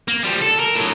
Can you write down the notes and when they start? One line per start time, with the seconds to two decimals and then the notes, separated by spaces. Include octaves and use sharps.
0.08 A#3
0.24 F3 G3
0.42 A4
0.60 A#4
0.75 A2 F#3